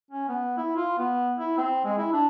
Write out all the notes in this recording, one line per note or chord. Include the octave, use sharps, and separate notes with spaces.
C#4
B3
E4
F4
B3
E4
C4
G#3
E4
D4